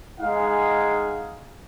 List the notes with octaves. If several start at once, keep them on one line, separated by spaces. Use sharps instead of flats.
G#3 D#4 G#4 F5 F#5